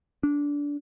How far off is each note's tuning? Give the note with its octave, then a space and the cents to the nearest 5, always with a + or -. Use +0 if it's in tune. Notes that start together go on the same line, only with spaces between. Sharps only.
D4 -20